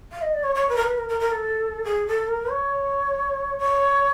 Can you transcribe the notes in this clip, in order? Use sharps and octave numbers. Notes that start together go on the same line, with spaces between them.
F5
D#5
D5
C#5
C#5
B4
A#4
B4
A#4
A#4
A#4
A4
G#4
A4
A#4
C#5
C#5